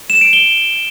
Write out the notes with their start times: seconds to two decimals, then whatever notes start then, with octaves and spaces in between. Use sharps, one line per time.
0.10 E7
0.21 D7
0.33 G7